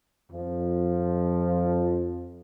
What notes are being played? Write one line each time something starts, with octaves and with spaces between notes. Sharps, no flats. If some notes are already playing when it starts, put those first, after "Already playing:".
F2 F3